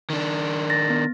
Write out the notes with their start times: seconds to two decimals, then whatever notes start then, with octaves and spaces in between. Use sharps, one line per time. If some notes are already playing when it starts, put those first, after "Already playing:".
0.10 D#3 D4
0.70 A6 A#6
0.90 B3